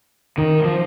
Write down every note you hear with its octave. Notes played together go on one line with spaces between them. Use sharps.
D#3
F3